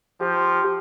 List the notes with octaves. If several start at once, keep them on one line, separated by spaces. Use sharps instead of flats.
F3 G4